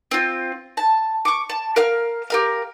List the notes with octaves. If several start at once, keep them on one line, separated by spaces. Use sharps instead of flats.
C4 F4
A5
C#6 D6
A5
A#4 F5 F6
G4 A#4 F5